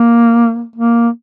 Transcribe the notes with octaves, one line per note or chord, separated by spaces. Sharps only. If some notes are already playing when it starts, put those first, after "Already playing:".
Already playing: A#3
A#3